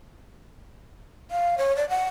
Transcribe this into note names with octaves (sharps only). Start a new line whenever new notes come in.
F5
C#5
D5
F#5